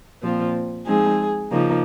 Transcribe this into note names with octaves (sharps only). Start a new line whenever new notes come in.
A#2 F3 C4 F4
F3 G#3 C4 D#4 G#4
C#3 F3 A#3 D#4